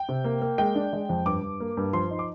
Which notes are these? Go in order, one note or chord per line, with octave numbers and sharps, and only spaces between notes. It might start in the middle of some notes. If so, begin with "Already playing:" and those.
Already playing: G5
C3
A#3
A#3
G#3 G5
D4
G#3
F2
G2 D6
G2
A#3
G2
F3 C6
D#4
D6